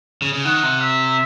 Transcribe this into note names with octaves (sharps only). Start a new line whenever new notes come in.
C#3
C#3
D#3 F#5
C3
E5